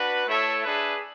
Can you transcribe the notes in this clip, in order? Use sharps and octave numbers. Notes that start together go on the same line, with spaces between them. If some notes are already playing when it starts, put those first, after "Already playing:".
Already playing: D4 F#4 B4
A3 E4 A4 C#5 E5
D4 G#4 B4 E5